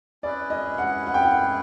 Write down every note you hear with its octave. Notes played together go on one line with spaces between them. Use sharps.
C#4 E4 G#4 B4 D5
D#5
F#5
F#5
G5
F#5